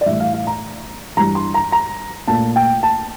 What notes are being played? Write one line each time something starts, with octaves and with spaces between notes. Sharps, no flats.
D5
A2 E3 G3 E5
F5
F5
A#5
G2 E3 G3 A#5
C6
A#5
A#5
A#2 A3 A5
G5
A5